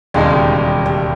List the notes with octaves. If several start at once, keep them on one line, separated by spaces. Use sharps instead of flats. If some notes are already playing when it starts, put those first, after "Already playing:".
E1 D#2 C#3 G3 G#3 D#4
G3